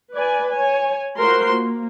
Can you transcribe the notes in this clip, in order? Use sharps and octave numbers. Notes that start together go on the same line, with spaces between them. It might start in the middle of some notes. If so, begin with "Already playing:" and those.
B4 D5 G#5
C#5 G#5
A3 F4 F#4 A#4 C5 C6
A#3